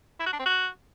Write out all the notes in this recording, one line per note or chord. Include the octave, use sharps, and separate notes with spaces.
E4
F#4
D4
C4
F#4